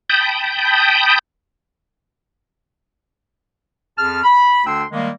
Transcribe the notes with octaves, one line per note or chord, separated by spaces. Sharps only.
G5 A5 B5 D#6 G6
F2 G#4 A5 F6
B5
D2 D3 D4 G5 C6 E6
D#3 G3 G#3 A#3